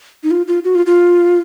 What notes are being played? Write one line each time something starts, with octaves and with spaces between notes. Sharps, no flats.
D#4
F4
F4
F#4
F4
F4